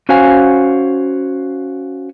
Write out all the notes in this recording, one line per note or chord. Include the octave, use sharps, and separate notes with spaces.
C#4 F#4 C5 F5 G#5